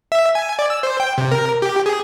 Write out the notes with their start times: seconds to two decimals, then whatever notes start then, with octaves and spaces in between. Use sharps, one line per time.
0.12 E5
0.35 G#5
0.59 D5
0.70 E6
0.83 C5
1.00 G5
1.18 C3
1.31 A#4
1.62 G4
1.86 G#4